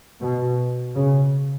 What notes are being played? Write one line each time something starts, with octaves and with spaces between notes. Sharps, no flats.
B2
C#3